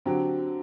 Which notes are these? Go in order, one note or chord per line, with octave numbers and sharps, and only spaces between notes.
D3 F#3 C4 G4